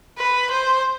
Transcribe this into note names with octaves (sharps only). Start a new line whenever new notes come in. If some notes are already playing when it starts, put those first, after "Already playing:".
B4
C5